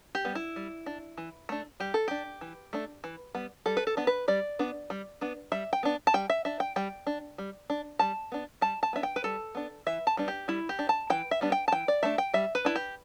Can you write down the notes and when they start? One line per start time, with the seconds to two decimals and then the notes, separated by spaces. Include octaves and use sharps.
0.15 G4
0.25 G3 B3
0.35 E4
0.56 G3
0.86 D4
1.17 E3
1.49 A3 D4
1.80 G3 G4
1.94 A4
2.08 D4 G4
2.41 E3
2.73 A3 D4
3.04 E3
3.35 G3 B3
3.66 G3 A4
3.77 B4
3.87 A4
3.97 B3 D4
4.07 B4
4.28 G3 D5
4.59 B3 D4
4.90 G3
5.21 B3 D4
5.52 G3 E5
5.73 G5
5.83 B3 D4
6.07 A5
6.14 G3 G5
6.30 E5
6.45 D4 E5
6.60 G5
6.76 G3 G5
7.07 D4
7.38 G3
7.70 D4
7.99 G3 A5
8.32 B3 D4
8.61 G3 A5
8.83 A5
8.93 B3 D4 E5
9.03 G5
9.16 B4
9.24 G3 A4
9.55 B3 D4
9.86 E3 E5
10.07 A5
10.17 G3 B3 D4
10.28 G4
10.48 G3 E4
10.69 G4
10.79 D4
10.89 A5
11.10 E3 G5
11.31 E5
11.41 G3 B3 D4
11.52 G5
11.68 A5
11.72 E3 G5
11.88 D5
12.03 A3 D4 E5
12.18 G5
12.34 G3 E5
12.55 B4
12.65 D4 E4
12.76 G4